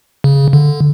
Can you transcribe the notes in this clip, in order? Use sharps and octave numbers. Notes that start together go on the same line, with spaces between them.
C#3
D3